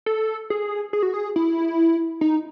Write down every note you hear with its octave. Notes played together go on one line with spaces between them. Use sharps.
A4
G#4
G#4
F#4
G#4
E4
D#4